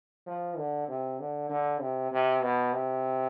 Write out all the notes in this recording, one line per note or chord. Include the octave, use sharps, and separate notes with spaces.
F3
D3
C3
D3
D3
C3
C3
B2
C3